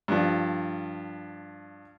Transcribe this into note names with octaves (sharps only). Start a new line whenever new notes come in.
G2 F3